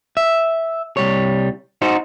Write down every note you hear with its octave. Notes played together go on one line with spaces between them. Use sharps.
E5
C2 G3 C#5
D#4 F#4 C5